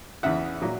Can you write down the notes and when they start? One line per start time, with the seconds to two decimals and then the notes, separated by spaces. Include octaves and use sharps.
0.23 E2 C#3 E3 E5 F#5
0.62 A#2 F#3